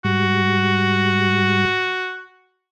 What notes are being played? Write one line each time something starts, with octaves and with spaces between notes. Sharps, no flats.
G#2 G3 F#4